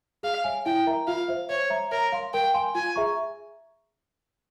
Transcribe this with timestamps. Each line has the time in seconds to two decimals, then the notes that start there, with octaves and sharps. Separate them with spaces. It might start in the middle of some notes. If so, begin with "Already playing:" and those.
0.23 G#4 F5
0.44 C#5 E5 G#5
0.66 E4 G5
0.87 A#4 E5 A#5
1.07 F4 F5
1.28 C5 E5
1.49 C5 C#5
1.70 E5 A#5
1.92 A#4 C#5
2.12 F5 C6
2.33 A#4 G5
2.54 F5 G#5 C6
2.75 F4 G#5
2.96 G#4 E5 A#5 C#6